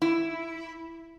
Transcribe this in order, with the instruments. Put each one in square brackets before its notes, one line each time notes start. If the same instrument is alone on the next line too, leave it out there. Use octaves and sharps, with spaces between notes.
[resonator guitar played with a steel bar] E4